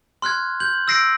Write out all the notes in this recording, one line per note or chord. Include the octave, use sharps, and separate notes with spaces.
C6 F6 F#6 G#6
G6 F#7
E6 G6 A#6 C7 D7